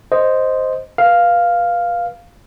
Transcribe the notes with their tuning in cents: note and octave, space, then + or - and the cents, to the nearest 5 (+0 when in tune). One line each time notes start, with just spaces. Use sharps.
C5 +0 D#5 +0
B4 -30 F5 +0